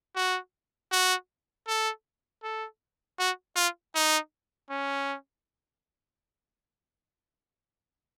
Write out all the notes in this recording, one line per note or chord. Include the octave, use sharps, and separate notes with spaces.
F#4
F#4
A4
A4
F#4
F4
D#4
C#4